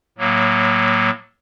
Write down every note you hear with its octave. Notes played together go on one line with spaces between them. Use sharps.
A2 F#3 A#3